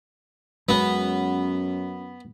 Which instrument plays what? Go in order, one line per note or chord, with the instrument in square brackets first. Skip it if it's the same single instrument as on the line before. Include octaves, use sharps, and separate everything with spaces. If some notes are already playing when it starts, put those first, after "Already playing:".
[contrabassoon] F#2 [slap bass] G#3 [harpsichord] B3 [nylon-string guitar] C#4 F#4